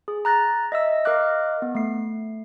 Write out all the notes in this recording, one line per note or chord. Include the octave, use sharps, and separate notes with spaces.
G#4
A#5 F#6 A6 A#6
D#5 E5 E6
A#4 D#5 F5 D6 F#6
B3
A3 C7